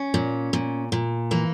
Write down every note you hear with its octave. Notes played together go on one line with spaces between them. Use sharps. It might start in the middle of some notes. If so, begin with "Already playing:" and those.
Already playing: C#4
A#2
A#2
A#2
E3 A#3